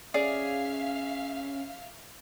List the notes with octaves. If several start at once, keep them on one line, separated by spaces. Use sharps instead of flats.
C#4 G#4 D5 E5 F5 F6